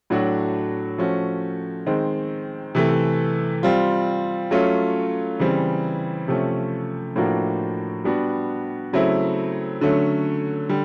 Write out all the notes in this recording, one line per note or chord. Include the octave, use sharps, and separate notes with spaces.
A2 F#3 A3 D4 F#4
F3 A3 C#4 F#4
D#3 G#3 C4
C3 E3 A3
G3 C4 F4
F#3 A3 C#4 F4
C#3 E3 G3 C4
C3 F3 A3 C#4
A2 F3 A#3 D4 F#4
G3 B3 D4 F#4
C#3 F#3 A3 C4 E4
D3 F#3 A3 C#4
D3 G3